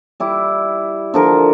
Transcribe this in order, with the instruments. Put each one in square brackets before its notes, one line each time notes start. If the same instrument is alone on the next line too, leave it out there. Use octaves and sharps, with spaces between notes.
[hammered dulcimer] G3 E4 D6
D3 F3 A#4